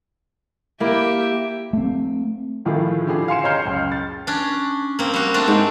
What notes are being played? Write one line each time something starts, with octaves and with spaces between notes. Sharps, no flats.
A#3 E4 G4 E5
A3 C4
A2 D#3 F3 E4 F4 G#4
D3 E4 G4 G#4
F5 G#5 C6 C#7 E7
C#5 D#5 A#5 F6 G6 C7
C#2 F#2
A6
C#4 D4
A#3 C4
G3 F#4
A3 C4 D4
G#2 G5